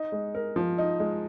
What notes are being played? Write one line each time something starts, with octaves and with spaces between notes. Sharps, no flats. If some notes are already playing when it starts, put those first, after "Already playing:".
Already playing: D#4
G#3
A#4
F3
D#4
G#3